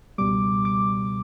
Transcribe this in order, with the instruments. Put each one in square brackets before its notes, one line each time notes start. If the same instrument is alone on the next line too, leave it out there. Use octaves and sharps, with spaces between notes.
[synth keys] C#2 B2 G3 D6
D6